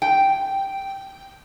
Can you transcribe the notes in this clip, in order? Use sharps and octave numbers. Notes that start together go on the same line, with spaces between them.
G5